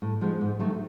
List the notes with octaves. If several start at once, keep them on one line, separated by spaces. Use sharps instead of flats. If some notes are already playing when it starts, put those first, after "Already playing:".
A2
F3 G#3 B3 D#4
G#2
D#3 F#3 A3